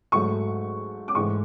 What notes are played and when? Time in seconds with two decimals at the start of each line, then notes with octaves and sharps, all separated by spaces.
0.12 G#2 F#3 A3 C#6
1.08 D6
1.15 G#2 E3 A3 C#6